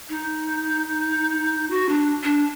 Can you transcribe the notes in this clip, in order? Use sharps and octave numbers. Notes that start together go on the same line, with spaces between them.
D#4
F#4
D4
D4